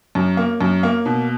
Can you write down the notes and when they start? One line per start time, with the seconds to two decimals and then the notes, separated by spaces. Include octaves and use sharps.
0.15 F#2
0.37 A#3
0.61 F#2
0.83 A#3
1.05 B2